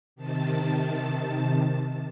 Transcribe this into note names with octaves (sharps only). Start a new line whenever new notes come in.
C3 D#3 A5